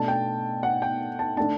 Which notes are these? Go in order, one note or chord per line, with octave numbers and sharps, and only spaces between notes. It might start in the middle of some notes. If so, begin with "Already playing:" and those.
Already playing: B2 A3 D4 A5
G5
F#5
G5
A5
D3 A3 D4 A5